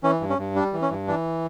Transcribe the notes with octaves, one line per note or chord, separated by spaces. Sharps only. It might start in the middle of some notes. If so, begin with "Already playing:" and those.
E3 C#4
G2
C#4
G2
G3 D4
E3
C#4
G2
E3 D4